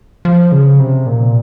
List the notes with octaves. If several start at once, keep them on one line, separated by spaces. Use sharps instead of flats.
F3
C#3
C3
A#2